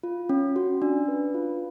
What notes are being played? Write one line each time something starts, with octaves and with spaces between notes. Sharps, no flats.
F4
C#4
F#4
D4
B4
F4